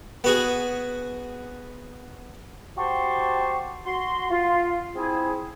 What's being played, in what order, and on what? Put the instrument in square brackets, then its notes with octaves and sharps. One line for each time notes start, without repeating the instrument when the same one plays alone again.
[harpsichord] B3 F#4 G#4
[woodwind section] F#4 G4 C5 A5 C6 C#6
F#4 C6
F4
C4 E4 G#4